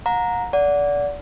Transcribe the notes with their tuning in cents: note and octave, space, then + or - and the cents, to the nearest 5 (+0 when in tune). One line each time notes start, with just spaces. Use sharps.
F#5 -40 A#5 +0
D5 -25 F#5 -10